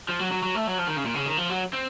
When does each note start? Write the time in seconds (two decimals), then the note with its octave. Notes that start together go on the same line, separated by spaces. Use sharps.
0.09 F3
0.19 F#3
0.32 F#3
0.43 F#3
0.55 A3
0.67 F#3
0.78 F3
0.87 D#3
0.96 C#3
1.05 A#2
1.15 C#3
1.26 D#3
1.37 F3
1.50 F#3
1.73 C4